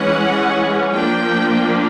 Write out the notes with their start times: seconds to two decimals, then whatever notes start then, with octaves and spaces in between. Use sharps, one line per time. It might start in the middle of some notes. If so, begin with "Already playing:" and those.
Already playing: E3 G#3 C#4 F#5
0.92 F3 A#3 D4 G5